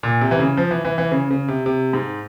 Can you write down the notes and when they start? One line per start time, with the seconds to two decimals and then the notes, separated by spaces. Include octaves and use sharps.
0.03 A#2
0.21 C3
0.31 E3
0.39 C#3
0.57 F3
0.71 E3
0.85 E3
0.98 E3
1.12 C#3
1.31 C#3
1.48 C3
1.66 C3
1.93 G#2